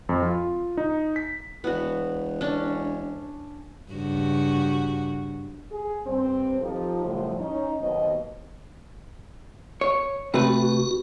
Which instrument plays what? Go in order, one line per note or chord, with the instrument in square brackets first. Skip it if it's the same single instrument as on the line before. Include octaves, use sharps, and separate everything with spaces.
[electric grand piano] F2
F4
D#4
B6
[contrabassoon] E1 [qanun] B3 F#4
[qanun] C#4 D4
[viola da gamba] G2 C#3 F#4
[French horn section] G#4
G2 C4 C5
F3 D#4 F4 G4 A4
F#2 A2 C#3 F3 G3 C5
C#4 D#4
D#2 B2 F#3 B3 C5 D#5
[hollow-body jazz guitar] C#5
[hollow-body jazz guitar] C3 A3 B4 [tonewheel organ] F#4